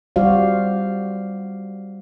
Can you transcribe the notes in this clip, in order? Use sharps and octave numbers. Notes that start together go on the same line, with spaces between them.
G3 F#4 C5 D5 F5